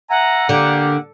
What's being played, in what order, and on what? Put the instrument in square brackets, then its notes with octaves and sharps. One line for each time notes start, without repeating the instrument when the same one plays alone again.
[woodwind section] E5 G#5 A#5 [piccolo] F#5
[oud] D3 [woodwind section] A#3 G4